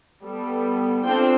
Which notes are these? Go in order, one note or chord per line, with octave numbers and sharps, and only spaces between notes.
G3 B3 A4
C4 D4 F4 A4 C5 G5